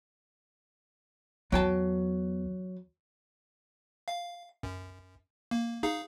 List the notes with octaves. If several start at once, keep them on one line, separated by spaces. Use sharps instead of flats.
E2 F#3 G5 A5
F5
F#2
A#3
D#4 G#4 F5